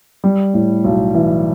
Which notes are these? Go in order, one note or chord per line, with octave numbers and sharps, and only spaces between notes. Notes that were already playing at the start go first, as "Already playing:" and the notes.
G3
A2
B1
E3